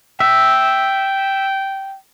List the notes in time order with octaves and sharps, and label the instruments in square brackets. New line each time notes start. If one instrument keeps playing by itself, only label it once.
[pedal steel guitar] E5 [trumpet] G5